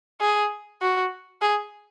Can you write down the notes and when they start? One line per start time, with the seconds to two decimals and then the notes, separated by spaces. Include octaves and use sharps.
0.21 G#4
0.81 F#4
1.42 G#4